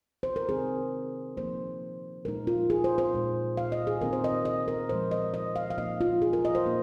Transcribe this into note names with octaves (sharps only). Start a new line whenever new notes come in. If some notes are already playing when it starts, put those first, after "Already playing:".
C5
A#4
C3 D#3 C4 D#4 G#4
F3 A#3 D#4 C5
A#2 G#3 D#4 A#4
F4
G#4
C5
C5
A#2 G#3 D#4
F5
D#5
G#4
D#3 C4 D#4 A#4
C5
D#5
D#5
A#4
A#2 F3 G#3 C5
D#5
D#5
F5
F5
A#2 F3 A#3 D#4 D#5
F4
G#4
A#4
D#5
C5
A#2 A#3 D#4